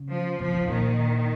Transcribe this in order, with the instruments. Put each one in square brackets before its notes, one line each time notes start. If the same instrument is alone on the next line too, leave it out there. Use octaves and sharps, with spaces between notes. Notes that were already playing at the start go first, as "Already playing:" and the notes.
Already playing: [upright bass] C#3
[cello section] F3
[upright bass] C3 [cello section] F3
[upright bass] C3
[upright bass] A#2 [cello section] D#3